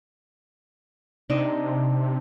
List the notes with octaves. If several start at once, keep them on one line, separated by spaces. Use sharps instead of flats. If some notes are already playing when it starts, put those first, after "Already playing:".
C3 D4 D#4 D#5